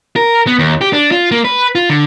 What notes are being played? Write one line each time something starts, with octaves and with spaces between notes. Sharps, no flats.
A#4
B3
D#2
G4
D4
F4
A#3
B4
F4
D3